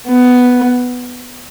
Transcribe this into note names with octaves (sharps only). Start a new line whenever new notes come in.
B3